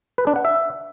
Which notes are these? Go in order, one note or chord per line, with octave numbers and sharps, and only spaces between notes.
B4
D4
F#5
E5